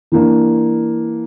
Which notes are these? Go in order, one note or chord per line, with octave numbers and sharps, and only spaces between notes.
E3 A#3 D4